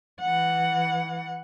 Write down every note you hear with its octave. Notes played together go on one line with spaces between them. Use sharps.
E3 F#5